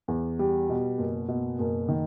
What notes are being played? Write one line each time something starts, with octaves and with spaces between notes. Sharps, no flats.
E2
G3
B2
F#1
B2
F#1
D#3